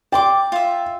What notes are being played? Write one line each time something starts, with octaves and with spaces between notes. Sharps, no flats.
D5 G5 C6 D6
F4 E5